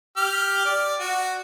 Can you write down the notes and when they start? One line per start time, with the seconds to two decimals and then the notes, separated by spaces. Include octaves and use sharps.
0.17 G4 F6
0.65 D5
1.00 F#4